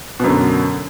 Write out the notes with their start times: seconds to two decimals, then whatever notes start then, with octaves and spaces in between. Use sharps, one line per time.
0.20 B2
0.24 F#2
0.28 D3